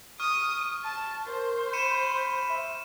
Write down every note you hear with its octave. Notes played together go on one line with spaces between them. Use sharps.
C#6 D#6 F6
A5
A#4 C5
B5 C#7 D#7 E7
E5